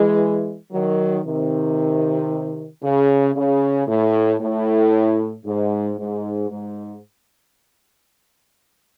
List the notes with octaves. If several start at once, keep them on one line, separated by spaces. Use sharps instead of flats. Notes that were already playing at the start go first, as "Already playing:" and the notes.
Already playing: E3 G#3
D#3 F#3
C3 D#3
C#3
C#3
A2
A2
G#2
G#2
G#2